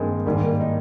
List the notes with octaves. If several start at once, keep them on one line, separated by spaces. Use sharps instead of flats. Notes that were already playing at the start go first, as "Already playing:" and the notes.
Already playing: G2 D#3 G#3 A#3 C4
G#2 D#3 G3
A#3
D#4